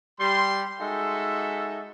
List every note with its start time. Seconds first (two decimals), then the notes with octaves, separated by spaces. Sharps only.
0.20 G3 C6
0.80 G#3 D#4 F#4 A4 E5